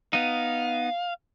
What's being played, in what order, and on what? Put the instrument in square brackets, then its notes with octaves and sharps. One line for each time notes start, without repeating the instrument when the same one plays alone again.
[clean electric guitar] B3 D#4 [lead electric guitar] F5